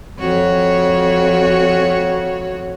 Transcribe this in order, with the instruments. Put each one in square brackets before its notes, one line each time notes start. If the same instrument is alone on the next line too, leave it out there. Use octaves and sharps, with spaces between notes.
[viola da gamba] F2 F#4 C#5